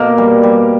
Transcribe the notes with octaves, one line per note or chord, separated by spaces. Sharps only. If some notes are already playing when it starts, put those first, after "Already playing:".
Already playing: B2 A#3 A#4
G3
G3